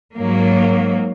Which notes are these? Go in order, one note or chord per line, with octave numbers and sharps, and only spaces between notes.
G#2 F#3 A#3